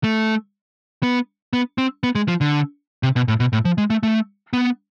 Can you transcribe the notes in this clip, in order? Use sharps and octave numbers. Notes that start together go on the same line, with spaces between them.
A3
B3
B3
C4
B3
G#3
F3
D3
C3
B2
A2
B2
A2
F3
G#3
A3
A3
B3